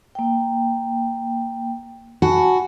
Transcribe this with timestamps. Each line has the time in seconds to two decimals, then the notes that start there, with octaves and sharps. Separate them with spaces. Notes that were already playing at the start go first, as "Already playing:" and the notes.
0.15 A#3 G5
2.22 F#4 G#5 A5 B5